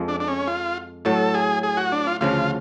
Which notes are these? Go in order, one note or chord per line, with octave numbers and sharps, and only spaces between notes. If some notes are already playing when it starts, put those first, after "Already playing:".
Already playing: F2 F3 G#3
D4
D4
C#4
F4
A2 F#3 A3 A4
G#4
G#4
F#4
D4
F4
D2 C#3 F3 F4